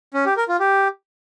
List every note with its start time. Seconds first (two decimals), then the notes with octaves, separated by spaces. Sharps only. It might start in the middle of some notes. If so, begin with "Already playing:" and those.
0.14 C#4
0.25 G4
0.37 A#4
0.48 F4
0.60 G4